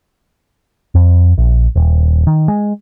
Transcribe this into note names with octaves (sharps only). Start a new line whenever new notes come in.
F2
A#1
D#1
D#3
G#3